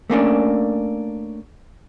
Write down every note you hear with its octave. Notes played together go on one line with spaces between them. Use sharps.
A3 A#3 C#4 D4